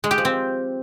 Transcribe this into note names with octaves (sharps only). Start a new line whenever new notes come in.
G#3
G4
F3
C4